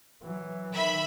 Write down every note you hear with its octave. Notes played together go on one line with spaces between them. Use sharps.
E3 F#3
D#3 E5 B5